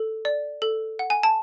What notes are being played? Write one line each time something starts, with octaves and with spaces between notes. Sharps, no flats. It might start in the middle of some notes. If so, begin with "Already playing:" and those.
Already playing: A4
D5
A4
F#5
G#5
A5